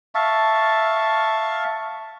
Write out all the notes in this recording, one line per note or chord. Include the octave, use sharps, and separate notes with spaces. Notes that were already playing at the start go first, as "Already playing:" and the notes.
E5 F5 A5 C#6